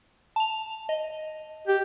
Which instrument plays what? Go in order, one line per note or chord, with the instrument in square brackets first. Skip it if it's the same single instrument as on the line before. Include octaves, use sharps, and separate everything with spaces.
[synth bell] A5 F7
D#5
[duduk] G4